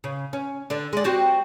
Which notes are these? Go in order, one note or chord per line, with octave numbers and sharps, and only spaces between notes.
C#3
C#4
D3 D4
G#3 D5
C4 F#4 G4